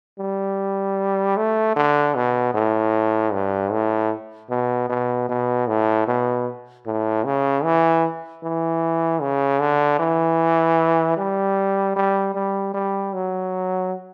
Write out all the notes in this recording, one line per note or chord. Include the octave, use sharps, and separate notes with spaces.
G3
A3
D3
B2
A2
G2
A2
B2
B2
B2
A2
B2
A2
C#3
E3
E3
C#3
D3
E3
G3
G3
G3
G3
F#3